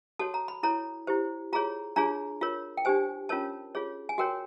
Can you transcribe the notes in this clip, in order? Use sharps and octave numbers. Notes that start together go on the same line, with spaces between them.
F#4 A4 C#5 A5
A#5
B5
E4 A4 C#5 A#5
E4 G4 C5
F4 G#4 C#5 A#5
D4 F4 G#4 C#5 A#5
F4 A#4 C#5
G5
D4 G4 C5 G#5
C#4 F4 A#4 C#5 A5
F4 G#4 C#5
G#5
F#4 A#4 C#5 G5